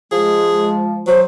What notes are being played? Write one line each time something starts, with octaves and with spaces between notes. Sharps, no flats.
F3 G#3 G#4
F#3 C5